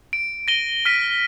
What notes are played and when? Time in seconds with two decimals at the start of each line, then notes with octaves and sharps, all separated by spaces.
0.13 D7
0.48 A#6 D#7 G7
0.85 F6 B6 D#7